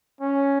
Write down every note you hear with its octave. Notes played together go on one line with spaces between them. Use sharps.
C#4